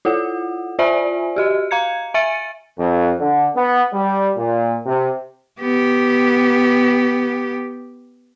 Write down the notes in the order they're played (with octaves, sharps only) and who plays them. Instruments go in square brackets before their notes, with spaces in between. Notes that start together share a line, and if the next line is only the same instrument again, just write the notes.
[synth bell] E4 F4 A4 F#5
F4 C5 D5 E5 G#5
F#4 G4 D#5
F5 A#5 G#6 C#7
E5 G#5 A6 C#7 D#7
[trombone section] F2
D3
B3
G3
A#2
C3
[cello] B3 G4